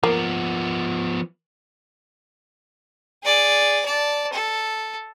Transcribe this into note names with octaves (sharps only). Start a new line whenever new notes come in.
F3 A#3 B3
G#4 D5
D5 A5
A4